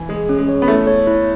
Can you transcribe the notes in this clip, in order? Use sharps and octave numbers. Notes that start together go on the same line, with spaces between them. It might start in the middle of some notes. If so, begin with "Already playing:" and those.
Already playing: E3 G#5
G#3 G#4
C#4
G#3
C#5
B3
A3 E4
C#5
E4